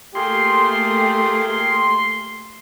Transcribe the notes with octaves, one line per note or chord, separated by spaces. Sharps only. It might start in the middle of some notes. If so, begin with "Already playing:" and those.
A3 A#3 F4 G4 G#4 A#4 C6